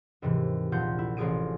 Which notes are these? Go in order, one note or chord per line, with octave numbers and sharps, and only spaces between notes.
D#2 G#2 C3 E3
A#1 A#2 F4 F#5 G6
E4
A1 C3 F4 G#4 D7 D#7